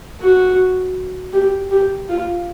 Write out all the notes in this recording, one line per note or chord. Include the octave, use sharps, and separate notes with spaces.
F#4
G4
G4
F4